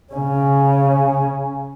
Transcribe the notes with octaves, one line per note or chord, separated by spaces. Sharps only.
C#3 C#4